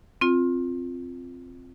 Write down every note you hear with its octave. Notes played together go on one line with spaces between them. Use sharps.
C4 F4